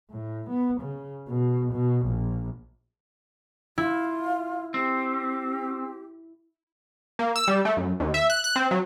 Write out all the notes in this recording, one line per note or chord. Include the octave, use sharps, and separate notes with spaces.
A2
B3
C#3
B2
B2
A#1
E4 F4
C4 G4
A#3
E6
G3
A3
F#2
D#2
E5
F#6
F#6
C4
F#3